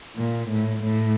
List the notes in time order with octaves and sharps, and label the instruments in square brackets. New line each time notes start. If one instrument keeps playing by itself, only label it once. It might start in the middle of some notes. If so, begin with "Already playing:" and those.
[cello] A#2
A2
A2